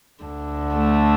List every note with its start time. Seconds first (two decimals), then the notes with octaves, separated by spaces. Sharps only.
0.24 D2 D3
0.74 A3